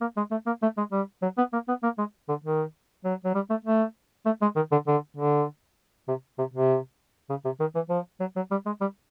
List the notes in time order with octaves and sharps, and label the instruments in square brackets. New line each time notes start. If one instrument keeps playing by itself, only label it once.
[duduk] A#3
G#3
A3
A#3
A3
G#3
G3
F#3
B3
A#3
B3
A#3
G#3
D3
D#3
F#3
F#3
G3
A3
A3
A3
G#3
D#3
D3
D3
D3
C3
C3
C3
C#3
C3
D#3
E3
F3
F#3
F#3
G3
G#3
G3